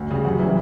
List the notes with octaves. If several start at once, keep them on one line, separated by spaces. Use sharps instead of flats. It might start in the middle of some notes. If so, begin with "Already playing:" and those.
Already playing: D2
C#3 G3
F#2 F#5
E3 G3 E5